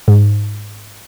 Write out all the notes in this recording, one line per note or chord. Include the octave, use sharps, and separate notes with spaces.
G#2